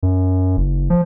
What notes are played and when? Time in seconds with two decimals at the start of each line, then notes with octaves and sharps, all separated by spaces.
0.03 F#2
0.57 F#1
0.90 F3